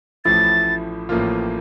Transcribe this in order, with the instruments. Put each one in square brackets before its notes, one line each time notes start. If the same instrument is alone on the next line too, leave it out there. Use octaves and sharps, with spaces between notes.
[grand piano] A1 A2 F3 A3 E4 [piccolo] A6
[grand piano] A1 A2 F3 A#3 F4